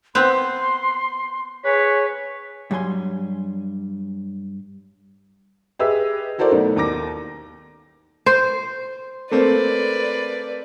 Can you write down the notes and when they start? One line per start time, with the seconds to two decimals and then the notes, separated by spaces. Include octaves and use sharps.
0.15 B3 C4 C6
1.64 G#4 B4 C#5 B6
2.71 G2 F#3 G3 G#5 C6
5.79 G4 G#4 B4 D#5 E5 E6
6.38 E4 F#4 A4 A#4 C5 D5
6.51 B1 A3 B3 D#4
6.77 D#2 A#5 D6 A#6
8.26 C5
9.31 A3 A#3 C4 B4 D5